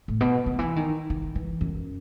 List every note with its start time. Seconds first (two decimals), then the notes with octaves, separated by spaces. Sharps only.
0.08 A2
0.21 B2
0.46 D#3
0.59 E3
0.76 D#3
1.10 D#3
1.35 E3
1.61 F#2